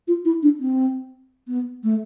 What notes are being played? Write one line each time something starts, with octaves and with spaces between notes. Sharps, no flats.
F4
E4
D4
C4
B3
A3